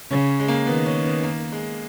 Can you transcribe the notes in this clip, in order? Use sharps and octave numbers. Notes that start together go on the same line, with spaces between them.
C#3 C#4
G#3
A#3
D#3 B3
C#4
B3
A#3
G#3